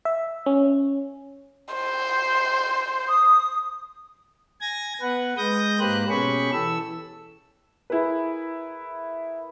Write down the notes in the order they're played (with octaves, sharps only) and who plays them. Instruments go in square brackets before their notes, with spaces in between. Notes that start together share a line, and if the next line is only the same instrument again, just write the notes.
[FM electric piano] E5
C#4
[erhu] C5
[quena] D#6
[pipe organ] G#5 G#6 A#6
B3 B4 F#5
G#3 D#6 G6 A#6
G#2 A#3 G4 B4 C5 F#6
B2 C#4 G4 G#4 B5 C#6
E3 A4 E6
[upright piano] E4 G#4 A#4 B4